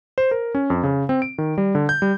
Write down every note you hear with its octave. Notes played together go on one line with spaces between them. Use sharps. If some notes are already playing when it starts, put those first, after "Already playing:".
C5
A#4
C#4
F2
C#3
C4
D7
D#3
G3
D3
G6
G3